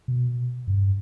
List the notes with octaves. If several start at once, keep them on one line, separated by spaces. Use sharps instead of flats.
B2
G2